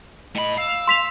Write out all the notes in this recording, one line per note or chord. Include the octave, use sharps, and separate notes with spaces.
A2 D#5 B5
F5 E6
C6 B6 F7